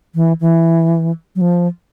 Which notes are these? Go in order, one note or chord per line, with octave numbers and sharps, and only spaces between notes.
E3
E3
F#3
F3